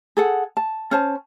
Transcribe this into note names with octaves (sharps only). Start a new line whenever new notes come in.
G#4 A4 F#5
A5
C#4 C5 A5